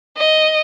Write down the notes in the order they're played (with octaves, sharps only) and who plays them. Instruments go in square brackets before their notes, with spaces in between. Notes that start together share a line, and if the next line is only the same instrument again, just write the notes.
[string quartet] D#5